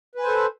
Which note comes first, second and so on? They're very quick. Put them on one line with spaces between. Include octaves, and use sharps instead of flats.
B4 G#5 C5 A4